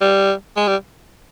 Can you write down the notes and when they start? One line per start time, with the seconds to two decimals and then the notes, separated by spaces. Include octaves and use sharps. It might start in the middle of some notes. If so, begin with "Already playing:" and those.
0.01 G3
0.57 G#3
0.68 G3